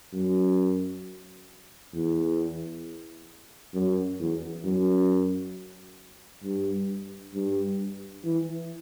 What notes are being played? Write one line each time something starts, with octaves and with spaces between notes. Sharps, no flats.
F#2
E2
F#2
E2
F#2
G2
G2
E3